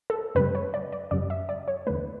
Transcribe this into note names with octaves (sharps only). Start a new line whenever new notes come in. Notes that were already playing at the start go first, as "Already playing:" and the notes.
A4
F#2 C#3 G3 B4
C#5
D5
D5
F#2 C#3 G3 D5
E5
D5
C#5
E2 D3 A3 B4